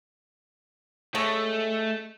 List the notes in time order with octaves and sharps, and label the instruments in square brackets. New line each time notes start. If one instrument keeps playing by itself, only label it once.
[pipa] G#3 C#4 A4 [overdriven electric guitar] A3